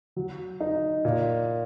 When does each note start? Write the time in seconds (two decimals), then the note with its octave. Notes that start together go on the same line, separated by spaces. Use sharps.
0.16 F#3
0.60 D#4
1.05 A#2